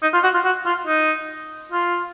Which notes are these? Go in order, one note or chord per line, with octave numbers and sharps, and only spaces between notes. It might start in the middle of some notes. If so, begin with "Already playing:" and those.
D#4
F4
F#4
F4
F#4
F4
D#4
F4